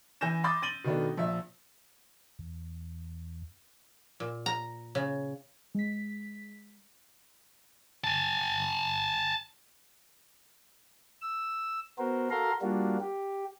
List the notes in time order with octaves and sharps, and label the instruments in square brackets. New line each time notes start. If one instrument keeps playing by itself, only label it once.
[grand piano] E3 G#5 G6 A#6 E7
B5 C6 D6 D#6 G6 A6
A6 D#7 F#7 G7
B2 D#3 A3 B3 D4
A#1 E5
[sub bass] E2
[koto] A#2
A#5
C#3
[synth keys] G#3 B6
[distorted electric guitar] G#5 A5
[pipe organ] E6
B3 F#4 A#4 C5
F#4 A4 A#4 F5 A#5 C6
G3 A#3 D4 F4 F#4
G4